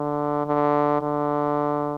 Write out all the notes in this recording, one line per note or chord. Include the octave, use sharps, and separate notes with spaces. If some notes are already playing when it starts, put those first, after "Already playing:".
Already playing: D3
D3
D3